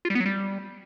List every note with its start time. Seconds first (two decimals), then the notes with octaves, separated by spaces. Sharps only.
0.05 F4
0.10 G3
0.15 B3
0.20 F#3
0.26 G3